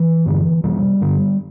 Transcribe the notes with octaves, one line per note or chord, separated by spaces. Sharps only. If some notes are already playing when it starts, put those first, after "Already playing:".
Already playing: E3
G2 D3
F2 C3 G3
G2 D3